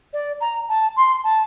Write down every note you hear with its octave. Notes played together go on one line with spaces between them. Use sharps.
D5
A#5
A5
C6
A5